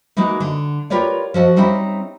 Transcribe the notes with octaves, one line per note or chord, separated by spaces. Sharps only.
E3 G#3 A#3 D#4 F#4
D3
F4 G4 A#4 B4 C#5 D5
F3 F#4 A4 D#5
G3 C4 C#4 D#4 E4